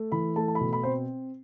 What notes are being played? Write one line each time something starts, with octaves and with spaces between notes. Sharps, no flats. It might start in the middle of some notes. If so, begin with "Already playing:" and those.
Already playing: A3
E3 B5
A3 A5
A5
B5
B2
B5
C4 C5